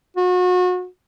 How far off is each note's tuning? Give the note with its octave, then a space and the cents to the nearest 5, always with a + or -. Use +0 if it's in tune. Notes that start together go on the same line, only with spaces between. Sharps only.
F#4 -35